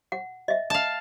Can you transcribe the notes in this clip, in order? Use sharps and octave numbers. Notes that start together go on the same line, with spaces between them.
F#5
D#5 E5
F5 A5